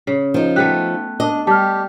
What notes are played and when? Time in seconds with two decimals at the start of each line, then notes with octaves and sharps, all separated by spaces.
0.07 C#3
0.34 F3 D#4
0.56 A3 B3 G4 F#6
1.20 D4 D#5
1.47 G3 G4 A5 F6